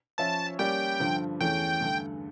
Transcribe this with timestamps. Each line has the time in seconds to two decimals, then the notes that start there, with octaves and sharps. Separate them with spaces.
0.18 F3 C#4 F4 C#5 E5 A5
0.59 G3 A#3 C#4 G4 D5 G5
1.00 G2 D3 F3
1.40 E2 E3 A3 C#4 G5
1.81 G2 D3 A3